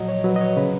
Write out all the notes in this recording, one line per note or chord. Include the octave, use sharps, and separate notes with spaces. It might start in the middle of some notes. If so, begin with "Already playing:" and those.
Already playing: A#2 F3 F#3 D#5
C#5
F#3 B4
D#5
C#5
C#3 B4